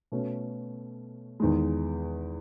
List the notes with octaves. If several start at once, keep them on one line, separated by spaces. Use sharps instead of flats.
B2 A3 C#4
E2 D#3 G#3